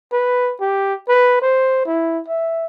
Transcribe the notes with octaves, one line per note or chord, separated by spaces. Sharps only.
B4
G4
B4
C5
E4
E5